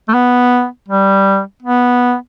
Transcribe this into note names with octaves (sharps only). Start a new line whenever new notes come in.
A3
B3
G3
B3